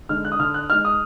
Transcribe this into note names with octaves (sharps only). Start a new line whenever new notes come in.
D3 G#3 D#4 F6
F#6
D#6
D3 F6
F#6
G#3 D#4 F6
D#6